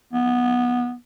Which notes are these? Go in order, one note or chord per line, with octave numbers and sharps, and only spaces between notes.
B3